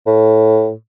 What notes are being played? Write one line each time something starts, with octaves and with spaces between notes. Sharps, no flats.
A2